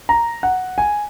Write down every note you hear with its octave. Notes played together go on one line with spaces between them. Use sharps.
A#5
F#5
G#5